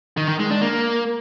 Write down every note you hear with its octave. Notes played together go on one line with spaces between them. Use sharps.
D#3
D#3
G#3
D4
A#3